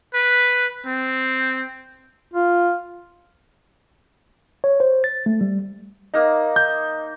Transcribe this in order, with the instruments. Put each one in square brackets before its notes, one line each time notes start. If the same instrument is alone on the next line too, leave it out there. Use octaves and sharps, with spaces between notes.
[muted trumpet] B4
C4
[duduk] F4
[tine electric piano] C#5
C5
A6
A3
G3
[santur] A#3 D#4 [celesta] D#5
[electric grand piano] G6